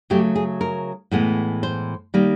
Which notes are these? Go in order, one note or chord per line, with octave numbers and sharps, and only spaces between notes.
C#3 F#3 A3 G4
G#4
A#4
A2 E3 G#3 B3
C5
D#3 G3 A#3